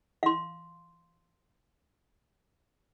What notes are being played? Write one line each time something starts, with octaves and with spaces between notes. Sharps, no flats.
F5 C6